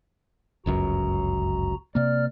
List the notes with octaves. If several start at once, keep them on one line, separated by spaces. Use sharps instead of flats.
G1 C#2 F#2 F#4 A#5
C3 A#3 D5 F6